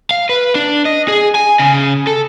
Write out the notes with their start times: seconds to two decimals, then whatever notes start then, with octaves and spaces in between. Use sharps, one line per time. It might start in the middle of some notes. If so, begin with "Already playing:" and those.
0.11 F5
0.29 B4
0.55 D4
0.85 D#5
1.08 G#4
1.35 G#5
1.59 C#3
2.07 A4